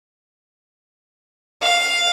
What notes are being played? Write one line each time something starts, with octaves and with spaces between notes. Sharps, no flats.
F5